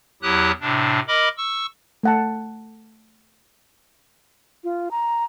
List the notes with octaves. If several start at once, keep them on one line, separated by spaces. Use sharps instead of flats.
E2 F#3 E4 G4 D#6 F#6
A2 C3 D4
A#4 D#5 B5 D6
C#6 E6
A3 F#5 A5
F4
A#5